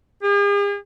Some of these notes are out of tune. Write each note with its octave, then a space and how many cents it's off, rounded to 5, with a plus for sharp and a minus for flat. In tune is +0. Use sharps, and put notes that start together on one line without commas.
G#4 -45